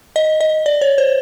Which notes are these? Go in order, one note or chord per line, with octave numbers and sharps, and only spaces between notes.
D#5
D#5
D5
C#5
C5